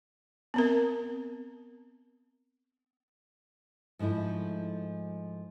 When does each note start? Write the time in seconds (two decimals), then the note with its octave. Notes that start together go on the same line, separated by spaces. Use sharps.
0.54 B3 C4 A#4
3.99 G#2 F3 A3 D#4 E4